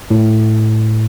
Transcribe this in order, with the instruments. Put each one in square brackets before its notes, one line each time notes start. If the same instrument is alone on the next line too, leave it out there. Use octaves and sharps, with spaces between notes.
[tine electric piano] A2